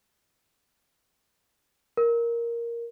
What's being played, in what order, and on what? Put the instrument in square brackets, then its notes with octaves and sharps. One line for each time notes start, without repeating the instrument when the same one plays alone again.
[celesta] A#4